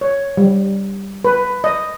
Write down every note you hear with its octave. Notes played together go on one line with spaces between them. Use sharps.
C#5
G3
B4
D#5